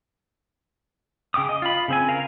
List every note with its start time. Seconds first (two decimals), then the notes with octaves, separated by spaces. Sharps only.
1.34 C#3 G5 D6 D#6
1.49 D#5
1.62 F4 B5
1.88 C#3 C4 G#5
2.08 A#4 F5